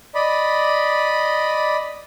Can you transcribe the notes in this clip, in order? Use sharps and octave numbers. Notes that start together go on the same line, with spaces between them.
D5 D#5 B5